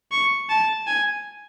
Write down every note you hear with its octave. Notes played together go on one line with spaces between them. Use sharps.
C#6
A5
G#5